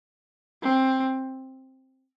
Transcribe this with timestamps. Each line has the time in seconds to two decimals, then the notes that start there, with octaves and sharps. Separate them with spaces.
0.62 C4